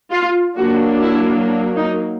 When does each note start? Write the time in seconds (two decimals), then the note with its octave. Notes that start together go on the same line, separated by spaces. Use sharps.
0.11 F4
0.57 F#3 A#3 D4 F#4
1.02 E4
1.47 D4
1.77 D#4